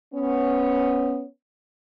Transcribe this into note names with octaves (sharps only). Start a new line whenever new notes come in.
B3 C#4